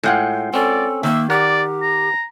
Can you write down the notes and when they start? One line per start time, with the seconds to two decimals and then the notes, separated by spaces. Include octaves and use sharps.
0.04 A2 G#3 F4 F#5 G5
0.54 C4 C#4 A4 D5
1.03 D#3 A#3 E5
1.30 G4 A#4 D5 F#5
1.82 A#5